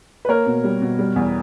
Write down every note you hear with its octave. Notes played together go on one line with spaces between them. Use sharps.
B4
A#3 A#4 C#5
B2
G3
B2
G3
E2